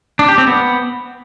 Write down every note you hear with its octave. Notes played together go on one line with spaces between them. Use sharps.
D4
G4
C4
B3